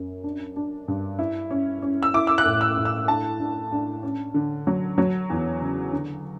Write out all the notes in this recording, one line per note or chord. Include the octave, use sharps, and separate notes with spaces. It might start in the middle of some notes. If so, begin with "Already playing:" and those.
Already playing: F#2
D4
D4
G2
E4
C#4
C#4
E6
E4 D6
E6
F#6
A2
E6
A2
E6
D4 A5
D4
D4
C#4
D3
F#3
F#3
E2
C#3
D3